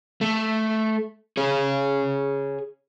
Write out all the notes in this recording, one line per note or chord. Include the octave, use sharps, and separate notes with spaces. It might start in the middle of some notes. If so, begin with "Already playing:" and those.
A3
G#4 C#5